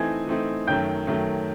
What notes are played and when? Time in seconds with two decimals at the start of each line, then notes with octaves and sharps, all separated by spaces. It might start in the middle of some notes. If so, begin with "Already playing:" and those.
Already playing: E3 A3 C4 D#4 G#5 G#6
0.27 E3 A3 C4 D#4
0.67 F#2 D#3 F#3 A3 G5 G6
1.07 F#2 D#3 F#3 A3